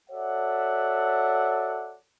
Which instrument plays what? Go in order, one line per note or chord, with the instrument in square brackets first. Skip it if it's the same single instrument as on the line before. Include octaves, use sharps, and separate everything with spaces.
[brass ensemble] F#4 A4 C#5 D5 E5 F#5